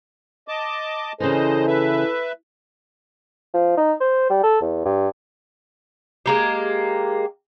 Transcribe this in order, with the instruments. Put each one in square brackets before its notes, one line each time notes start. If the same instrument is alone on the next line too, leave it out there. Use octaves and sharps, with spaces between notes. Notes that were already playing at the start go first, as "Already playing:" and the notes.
[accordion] D#5 A5 D6
[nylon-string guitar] C#3 E3 [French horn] A4 [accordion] C5 D#5
[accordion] B4 E5
[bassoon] F3
D#4
C5
G3
A4
E2
G2
[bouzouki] G#3 A#3 G4